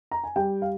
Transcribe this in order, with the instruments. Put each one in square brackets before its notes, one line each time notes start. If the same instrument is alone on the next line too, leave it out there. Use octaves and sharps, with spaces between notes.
[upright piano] A#5
G#5
G3 G5
F5